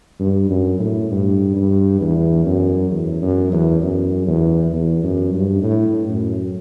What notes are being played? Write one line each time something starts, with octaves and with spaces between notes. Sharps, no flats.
G2
F#2
A2
G2
G2
E2
F#2
E2
F#2
E2
F#2
E2
E2
F#2
G2
A2
F#2